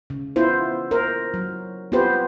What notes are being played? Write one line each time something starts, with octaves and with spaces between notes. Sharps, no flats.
C#3
B3 E4 F4 C5
A#4 C5
F#3
B3 C4 F4 G4 B4 C5